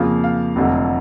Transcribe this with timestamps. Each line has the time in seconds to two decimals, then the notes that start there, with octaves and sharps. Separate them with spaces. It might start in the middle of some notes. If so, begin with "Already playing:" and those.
Already playing: F2 C#3 F3 A#3 F5
0.24 F5
0.56 F1 F2 D3 F#3 A3